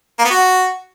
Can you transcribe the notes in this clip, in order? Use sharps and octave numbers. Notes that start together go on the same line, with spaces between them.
A#3
B3
F#4